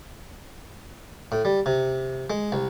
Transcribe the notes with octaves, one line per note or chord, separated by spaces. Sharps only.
A2
G3
C3
G#3
C2